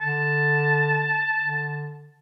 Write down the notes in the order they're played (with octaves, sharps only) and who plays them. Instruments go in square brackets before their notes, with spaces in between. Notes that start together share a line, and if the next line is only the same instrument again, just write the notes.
[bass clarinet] D3 [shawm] A5
[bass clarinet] D3